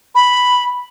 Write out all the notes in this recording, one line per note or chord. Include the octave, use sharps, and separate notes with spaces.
B5